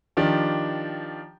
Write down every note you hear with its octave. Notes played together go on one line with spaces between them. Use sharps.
D#3 F3 D4 G4